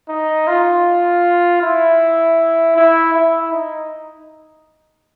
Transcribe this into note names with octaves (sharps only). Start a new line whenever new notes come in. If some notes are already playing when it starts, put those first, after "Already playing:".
D#4
F4
E4
E4
E4
D#4